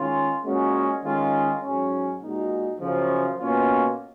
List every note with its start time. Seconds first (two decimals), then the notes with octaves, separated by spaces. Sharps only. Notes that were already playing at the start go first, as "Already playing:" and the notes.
Already playing: D#3 G#3 C#4 F4
0.43 A#2 G#3 C#4 F#4
1.03 D#3 G#3 C#4 F4
1.62 G#2 F#3 C#4
2.22 A#2 G#3 D#4 F#4
2.80 F#2 C#3 F3
3.40 B2 A#3 C#4 F4